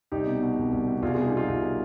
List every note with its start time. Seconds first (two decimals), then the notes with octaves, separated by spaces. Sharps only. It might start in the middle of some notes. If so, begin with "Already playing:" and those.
0.12 C2 D#4 G4
0.27 B2
0.42 B2
0.58 C2
0.72 C2
0.88 B2
1.02 C2 F4 G#4
1.14 B2 F4 G#4
1.25 D#4 G4
1.32 B2 F4
1.48 C2